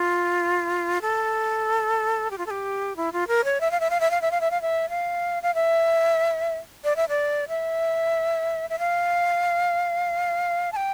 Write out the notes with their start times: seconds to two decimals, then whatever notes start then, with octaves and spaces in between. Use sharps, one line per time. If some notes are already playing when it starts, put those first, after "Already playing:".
Already playing: F4
1.02 A4
2.31 G4
2.38 F4
2.46 A4
2.50 G4
2.96 E4
3.13 F4
3.28 A#4
3.44 C#5
3.61 E5
3.71 F5
3.80 E5
3.90 F5
4.00 E5
4.11 F5
4.21 E5
4.31 F5
4.41 E5
4.51 F5
4.62 E5
4.89 F5
5.43 F5
5.55 E5
6.84 D5
6.96 E5
7.09 D5
7.49 E5
8.70 E5
8.79 F5
10.72 A5
10.76 G5